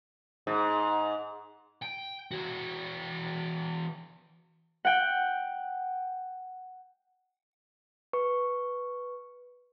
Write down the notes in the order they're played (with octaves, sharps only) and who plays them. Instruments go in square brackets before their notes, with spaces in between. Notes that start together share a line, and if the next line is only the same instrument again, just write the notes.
[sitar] G#2
[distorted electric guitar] G5
E3 F#4
[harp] F#5 G5
[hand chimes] B4 C#6